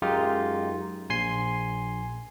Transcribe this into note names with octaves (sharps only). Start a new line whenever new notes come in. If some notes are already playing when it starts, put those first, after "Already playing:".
F#2 G#3 D#4 F4 G4
A#1 G#5 C6 C7